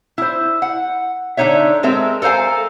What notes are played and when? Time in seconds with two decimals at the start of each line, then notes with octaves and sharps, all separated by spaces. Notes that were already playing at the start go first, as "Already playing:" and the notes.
0.18 E4 C5
0.62 F#5
1.37 D3 D4 D#4 C#5 E5
1.83 G#3 C4 A4 A#4 E5
2.22 A4 A#4 C5 F5 G#5